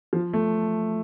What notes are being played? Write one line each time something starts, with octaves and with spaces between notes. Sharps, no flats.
F3
A3